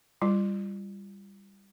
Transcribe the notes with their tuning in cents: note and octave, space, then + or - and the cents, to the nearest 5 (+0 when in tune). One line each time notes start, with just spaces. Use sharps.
G3 +10 F4 -25